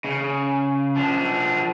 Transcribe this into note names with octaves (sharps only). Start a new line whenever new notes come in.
C#3
F3 D4